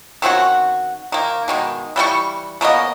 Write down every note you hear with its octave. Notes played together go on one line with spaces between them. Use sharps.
D#3 C4 C#4 F#4
D#3 A#3
B2 D#3 G#3
E3 G3 C4 C#6
C#3 A#3 B3 D#5